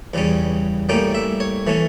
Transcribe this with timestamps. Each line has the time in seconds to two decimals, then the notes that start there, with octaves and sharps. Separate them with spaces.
0.14 E2 C#3 G3 C#4
0.89 A2 G3 A#3 C#4 G5
1.15 E5
1.40 C#5
1.67 E3 A3 C#4